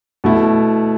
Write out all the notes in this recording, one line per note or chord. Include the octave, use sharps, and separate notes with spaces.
B2 A3 E4